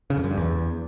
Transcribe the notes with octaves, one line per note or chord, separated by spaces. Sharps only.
C#3
F2
F#2
G2
E2